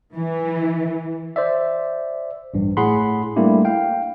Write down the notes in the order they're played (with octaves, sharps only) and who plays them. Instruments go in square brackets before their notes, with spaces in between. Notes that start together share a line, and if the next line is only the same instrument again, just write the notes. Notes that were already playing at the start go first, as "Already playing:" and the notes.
[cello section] E3
[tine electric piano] C5 D5 E5
A1 G2
A2 G#4 F#5 B5 C6
G3 A3 A#3 D4 E4 G4
F5 G5